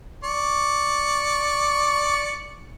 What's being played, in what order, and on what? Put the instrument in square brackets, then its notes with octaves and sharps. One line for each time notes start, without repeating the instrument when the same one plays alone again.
[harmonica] D5 C#6